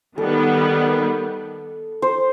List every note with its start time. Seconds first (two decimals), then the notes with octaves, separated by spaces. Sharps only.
0.18 D#3 G3 B3 A4
2.02 C5